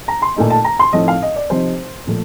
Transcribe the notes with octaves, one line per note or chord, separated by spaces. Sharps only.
A#5
C6
A#2 A3 D#4
A5
A#5
C6
A2 F3 C4 D#4 D#5
F5
D#5
D5
C3 F3 C4 D#4 C5
A#2 F3 A3